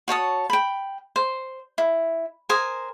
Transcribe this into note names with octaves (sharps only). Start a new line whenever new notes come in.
F#4 C#5 A5 D#6
G5 B5
C5
E4
A#4 C5 G#5 D#6